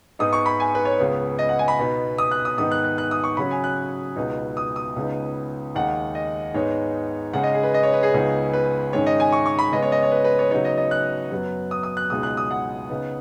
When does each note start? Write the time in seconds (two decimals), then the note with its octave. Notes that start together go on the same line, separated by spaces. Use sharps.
0.19 G#2 G#3 B3 D#4 D#6
0.33 C#6
0.46 B5
0.60 G#5
0.75 B4
0.85 C#5
0.99 C#2 C#3 B3
1.39 D#5
1.49 F#5
1.59 G#5
1.68 B5
1.78 B2 B3 D#4
2.18 D#6
2.31 F#6
2.45 D#6
2.58 G#2 D#3 B3 D#4 D#6
2.71 F#6
2.84 F#6
2.98 F#6
3.11 D#6
3.24 C#6
3.37 C#3 F#3 C#4 B5
3.51 G#5
3.64 F#6
4.16 C#2 B2 B3 D#4
4.57 D#6
4.76 D#6
4.96 C#2 C#3 B3 D#4
5.75 D#2 D#3 G#3 D#4 F#5
6.15 D#5
6.54 G#2 G#3 B3 D#4 C#5
7.33 C#3 G#3 D#4 F#5
7.43 D#5
7.54 G#4
7.63 B4
7.74 D#5
7.83 C#5
7.93 B4
8.03 G#4
8.14 C#2 C#3 B3 D#4
8.53 B4
8.93 G#2 D#3 G#3 C#4 C#5
9.06 D#5
9.20 G#5
9.32 C#6
9.46 C#6
9.59 B5
9.72 C#3 G#3 B3 D#5
9.82 C#5
9.92 D#5
10.02 C#5
10.12 B4
10.24 B4
10.39 C#5
10.51 C#3 F#3 B3 D#4 C#5
10.65 D#5
10.77 D#5
10.91 F#6
11.30 F#2 F#3 B3
11.71 D#6
11.83 D#6
11.97 F#6
12.10 C#2 B2 G#3 D#4 D#6
12.23 F#6
12.37 D#6
12.51 F#5
12.90 C#3 B3 D#4